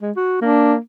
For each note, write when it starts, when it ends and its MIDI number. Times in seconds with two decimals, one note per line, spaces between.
0.01 0.11 56
0.16 0.40 66
0.41 0.78 58
0.41 0.73 62